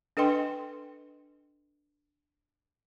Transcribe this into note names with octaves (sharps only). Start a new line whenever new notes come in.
D4 A4 B4 D#5 G5 C6